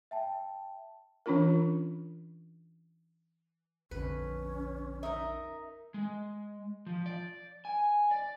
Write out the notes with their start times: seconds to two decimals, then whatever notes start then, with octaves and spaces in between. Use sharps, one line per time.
0.11 E5 G5 A5
1.26 E3 C#4 D4 F4 A#4
3.91 A#1 F2 D3 C#4 B4
5.03 D#4 A#4 E5
5.94 G#3
6.86 F3
7.06 D5
7.65 G#5
8.11 D5